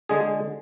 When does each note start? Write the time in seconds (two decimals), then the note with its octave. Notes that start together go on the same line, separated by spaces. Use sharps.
0.09 D3 G#3 G#4